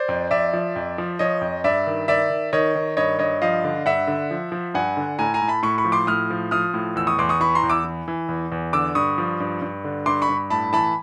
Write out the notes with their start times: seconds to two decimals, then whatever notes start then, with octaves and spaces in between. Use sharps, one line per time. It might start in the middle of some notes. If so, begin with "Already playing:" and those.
Already playing: C5 D5
0.09 F2
0.31 F2 D5 E5
0.53 F3
0.76 F2
0.98 F3
1.19 F3 C#5 D#5
1.41 F2
1.64 G2 D5 E5
1.87 D#3
2.08 D#3 D5 E5
2.30 D#3
2.53 D#3 C#5 D#5
2.75 D#3
2.97 G2 C#5 D#5
3.19 G2 C#5 D#5
3.42 F3 D#5 F5
3.64 D3
3.85 G2 E5 F#5
4.07 D3
4.31 F3
4.52 F3
4.74 G2 F#5 G#5
4.97 D3
5.19 A2 G#5 A#5
5.34 G#5 A#5
5.42 A2
5.48 A5 B5
5.63 A2 B5 C#6
5.78 B5 C#6
5.85 F3
5.92 C6 D6
6.07 A2 D#6 F6
6.30 F3
6.51 F3 D#6 F6
6.74 A2
6.96 E2 E6
7.07 C#6 D#6
7.19 E2 C6 D6
7.29 C#6 D#6
7.40 E3 B5 C#6
7.55 A#5 C6
7.63 E2
7.70 D6 E6
7.85 E3
8.08 E3
8.29 E2
8.52 E2
8.73 D3 D6 E6
8.95 G2 C#6 D#6
9.18 F3
9.40 G2
9.62 G2
9.84 D3
10.06 G2 C6 D6
10.22 B5 C#6
10.29 G2
10.50 A2 A5 B5
10.73 E3 A5 B5